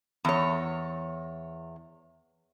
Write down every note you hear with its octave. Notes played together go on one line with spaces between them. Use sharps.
E2 C#5